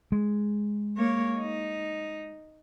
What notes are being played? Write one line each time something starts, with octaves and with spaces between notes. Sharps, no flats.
G#3
A#3 C#5
D#4